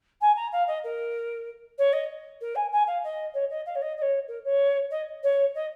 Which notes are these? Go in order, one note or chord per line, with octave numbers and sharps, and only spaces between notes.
G#5
A#5
F5
D#5
A#4
C#5
D#5
A#4
G#5
G#5
F5
D#5
C#5
D#5
F5
C#5
D#5
D#5
C#5
A#4
C#5
D#5
C#5
D#5